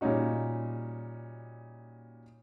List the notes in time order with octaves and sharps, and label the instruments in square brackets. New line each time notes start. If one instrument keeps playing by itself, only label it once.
[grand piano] A#2 G3 C#4 D#4 F#4